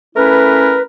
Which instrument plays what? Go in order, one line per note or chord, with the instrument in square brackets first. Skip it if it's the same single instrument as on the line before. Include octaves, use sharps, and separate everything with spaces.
[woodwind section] A3 C#4 E4 A#4 B4